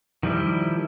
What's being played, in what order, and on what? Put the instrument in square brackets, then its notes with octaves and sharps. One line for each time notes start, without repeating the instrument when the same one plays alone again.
[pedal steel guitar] D#3 F3 G3 E4